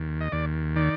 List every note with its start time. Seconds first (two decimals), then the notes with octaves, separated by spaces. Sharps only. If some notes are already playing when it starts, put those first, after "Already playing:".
Already playing: D#2
0.21 D#5
0.32 D#2 D5
0.76 D#3 D5